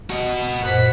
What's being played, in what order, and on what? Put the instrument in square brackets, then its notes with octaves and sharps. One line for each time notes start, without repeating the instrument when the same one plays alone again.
[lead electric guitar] F#4 D#5
[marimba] F#2 A#2 C5 [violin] F#5 B6